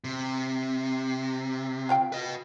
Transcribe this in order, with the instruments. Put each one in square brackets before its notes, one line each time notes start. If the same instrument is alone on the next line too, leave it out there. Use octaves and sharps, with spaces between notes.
[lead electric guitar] C3
[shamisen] F4 F5 G5
[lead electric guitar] B4 D#5